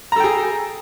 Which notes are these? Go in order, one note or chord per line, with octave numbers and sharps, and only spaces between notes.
G#4 A4 G5 A#5